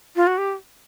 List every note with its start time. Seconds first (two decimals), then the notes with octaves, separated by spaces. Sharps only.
0.16 F4
0.27 F#4
0.38 G4